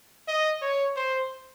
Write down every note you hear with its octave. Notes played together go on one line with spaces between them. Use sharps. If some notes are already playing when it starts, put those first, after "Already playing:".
D#5
C#5
C5